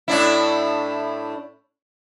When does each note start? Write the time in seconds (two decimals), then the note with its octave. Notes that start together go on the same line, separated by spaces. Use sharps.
0.08 A2 D4 E4